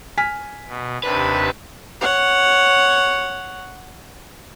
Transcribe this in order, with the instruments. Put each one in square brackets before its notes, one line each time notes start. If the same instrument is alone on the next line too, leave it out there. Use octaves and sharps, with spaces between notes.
[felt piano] G#5 F6 B6
[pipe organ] B2
[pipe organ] D#2 C3 D4 [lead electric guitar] B4
[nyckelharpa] C#5 F#5